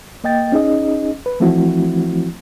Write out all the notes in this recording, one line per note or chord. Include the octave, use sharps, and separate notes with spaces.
A#3 D#5 G5 A6
C#4 D#4 G#4 D#5
B4
E3 F3 A3 C4 E4 F#4